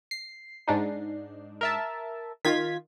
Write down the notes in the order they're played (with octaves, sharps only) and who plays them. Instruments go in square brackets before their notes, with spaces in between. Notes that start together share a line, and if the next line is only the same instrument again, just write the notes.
[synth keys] C7
[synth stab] G#2 D4 D#4
[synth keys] A#4 E5 A5
[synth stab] D#3 [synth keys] F4 G#6 B6